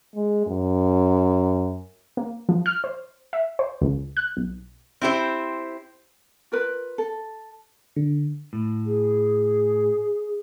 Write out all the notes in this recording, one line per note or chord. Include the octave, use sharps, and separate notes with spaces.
G#3
F#2
A#3
F3
F6
C5
E5
C5
C#2
F#6
B1
C4 E4 G4 C5
F4 A#4 B4
A4
D3
A2
G#4